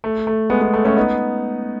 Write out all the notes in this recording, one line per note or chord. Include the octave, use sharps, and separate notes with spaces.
A3
A3
G#3 B3
G#3 B3
A3
A3 C#4
B3 D#4